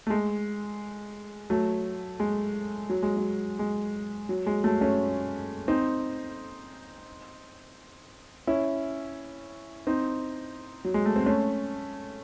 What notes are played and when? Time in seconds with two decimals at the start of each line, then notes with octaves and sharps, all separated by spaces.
0.07 A3
0.10 G#3
1.50 F#3 A3
2.20 G#3
2.89 F#3
3.03 G#3
3.17 F#3
3.59 G#3
4.29 F#3
4.47 G#3
4.64 F#3 A3
4.81 A3 C#4
5.68 C4 D#4
8.47 C#4 E4
9.87 C4 D#4
10.85 F#3
10.94 G#3
11.06 A3
11.16 C4
11.26 A3 C#4